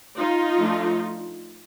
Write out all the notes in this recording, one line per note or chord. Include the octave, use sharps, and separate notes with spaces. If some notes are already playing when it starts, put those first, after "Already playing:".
D#4 F4
F3 A3 D4